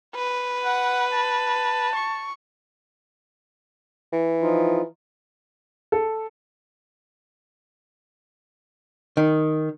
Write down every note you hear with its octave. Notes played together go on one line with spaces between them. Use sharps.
B4
F#5
A5
C#6
E3
F3 D#4 F4
A4
D#3